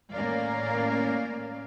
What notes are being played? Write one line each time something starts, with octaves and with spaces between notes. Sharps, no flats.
A2 A#3 C#4 A#4 D5 F5